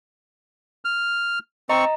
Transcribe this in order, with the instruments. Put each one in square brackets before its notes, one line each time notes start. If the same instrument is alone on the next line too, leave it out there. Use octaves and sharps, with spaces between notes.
[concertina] F6
[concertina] C4 C#6 [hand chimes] D#5 A#5